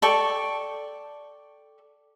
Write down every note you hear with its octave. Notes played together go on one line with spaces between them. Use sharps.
A4 D5 G5 C#6